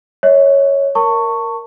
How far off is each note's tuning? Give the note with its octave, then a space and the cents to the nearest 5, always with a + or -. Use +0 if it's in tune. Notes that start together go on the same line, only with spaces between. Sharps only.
C#5 +0 E5 -45
A#4 +0 A5 +35 C#6 +0